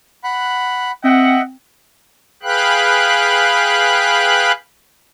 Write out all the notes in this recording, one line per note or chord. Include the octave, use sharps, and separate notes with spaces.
F#5 B5 F#6
C4 D#5 E5 F#5 G5
G#4 B4 F5 G5 B5 F#6